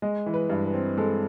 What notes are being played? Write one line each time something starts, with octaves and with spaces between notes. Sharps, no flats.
G#3 D#5
E3
B4
G2
B4
C4
G#3 A4